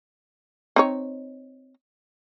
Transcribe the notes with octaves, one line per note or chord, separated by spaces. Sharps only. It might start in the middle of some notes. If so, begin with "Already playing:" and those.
C4 D#4 C#5